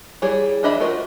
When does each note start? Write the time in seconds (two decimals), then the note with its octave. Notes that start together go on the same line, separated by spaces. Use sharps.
0.22 G3 E4 G#4 C#5
0.63 E3 D4 D#5 E5 B5
0.80 F4 F#4 A#4 C5 D#5